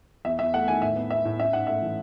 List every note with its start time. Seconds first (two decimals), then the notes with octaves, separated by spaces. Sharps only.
0.25 E2 E5
0.39 E2 E5
0.54 A3 F#5
0.67 D#3 G#5
0.82 A2 E5
0.96 B3
1.10 B3 E5
1.25 A2
1.39 C#4 E5
1.53 G#2 F#5
1.67 A3 E5
1.82 E3